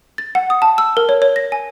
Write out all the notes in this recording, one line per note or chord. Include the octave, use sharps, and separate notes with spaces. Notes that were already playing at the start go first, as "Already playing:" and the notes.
A6
F#5
D#6
A5
E6
A#4
C#5
C#5
A#6
G#5